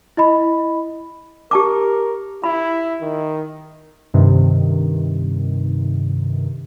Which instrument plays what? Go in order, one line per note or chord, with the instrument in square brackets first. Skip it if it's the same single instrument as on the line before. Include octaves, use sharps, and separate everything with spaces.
[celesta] E4 D#5 B5
[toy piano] G4 A5 D6 [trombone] A#4
[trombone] E4 [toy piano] B5
[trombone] D#3
[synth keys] G2 C3 D#3